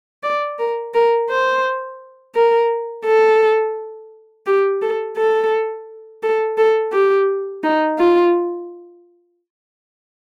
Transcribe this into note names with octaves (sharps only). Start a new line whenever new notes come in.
D5
A#4
A#4
C5
A#4
A4
G4
A4
A4
A4
A4
G4
D#4
F4